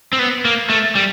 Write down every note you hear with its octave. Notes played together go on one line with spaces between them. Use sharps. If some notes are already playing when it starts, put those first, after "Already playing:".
C4
B3
A#3
A3
G3